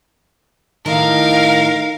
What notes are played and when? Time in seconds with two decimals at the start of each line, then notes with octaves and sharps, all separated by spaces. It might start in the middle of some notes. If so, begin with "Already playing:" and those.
0.86 A2 D#3 D#4 A#4 F5